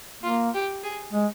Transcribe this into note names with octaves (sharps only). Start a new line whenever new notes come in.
A#3 F4
G4
G#4
G#3